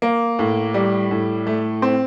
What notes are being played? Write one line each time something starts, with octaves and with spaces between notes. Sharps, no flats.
A#3
A2
G3
A2
A3
C4